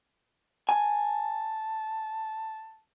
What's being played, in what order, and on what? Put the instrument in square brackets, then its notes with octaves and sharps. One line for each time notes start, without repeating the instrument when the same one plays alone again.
[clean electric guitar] G#5 [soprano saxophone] A5